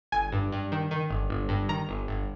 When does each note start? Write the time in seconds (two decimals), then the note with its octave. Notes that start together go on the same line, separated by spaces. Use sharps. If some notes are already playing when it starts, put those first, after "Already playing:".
0.12 G1 G#5
0.32 G2
0.52 G2
0.72 D#3
0.91 D#3
1.10 G1
1.30 G1
1.49 G2
1.69 D#3 A#5
1.89 G1
2.08 G1